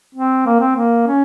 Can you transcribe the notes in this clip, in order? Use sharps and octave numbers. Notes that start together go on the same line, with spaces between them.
C4
A#3
C4
A#3
C#4